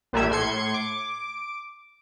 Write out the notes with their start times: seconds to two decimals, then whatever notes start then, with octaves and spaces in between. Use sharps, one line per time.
0.13 A#1 A#2 G3 A3 E5 G#6
0.31 A2 C6 G#6 C#7
0.74 D6